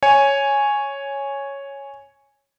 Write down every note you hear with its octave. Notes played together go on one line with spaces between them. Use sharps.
C#5 G#5